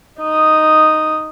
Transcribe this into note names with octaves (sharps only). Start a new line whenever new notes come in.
D#4 D#6